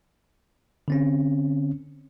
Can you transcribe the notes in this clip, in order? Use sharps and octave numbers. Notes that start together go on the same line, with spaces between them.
D3 C4 C#4